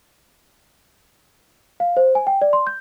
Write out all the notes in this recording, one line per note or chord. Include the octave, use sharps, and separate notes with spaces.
F5
C5
G#5
G5
D5
C6
G6